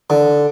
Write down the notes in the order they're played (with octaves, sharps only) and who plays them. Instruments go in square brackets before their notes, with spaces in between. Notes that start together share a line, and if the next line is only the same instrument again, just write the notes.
[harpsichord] D3